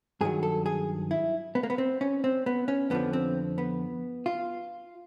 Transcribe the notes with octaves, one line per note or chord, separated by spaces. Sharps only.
G2 D#3 F#3 G#4
A4
G#4
E4
B3
A#3
B3
C4
C#4
C4
B3
C#4
F2 D3 F3 B3
C4
B3
F4